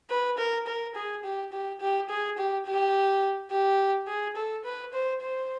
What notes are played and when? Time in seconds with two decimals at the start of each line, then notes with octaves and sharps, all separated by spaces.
0.10 B4
0.38 A#4
0.67 A#4
0.95 G#4
1.24 G4
1.52 G4
1.80 G4
2.10 G#4
2.38 G4
2.66 G4
3.51 G4
4.08 G#4
4.36 A4
4.65 B4
4.93 C5
5.21 C5